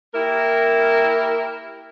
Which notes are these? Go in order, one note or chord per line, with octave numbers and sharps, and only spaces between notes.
A#3 E4 G4 A#4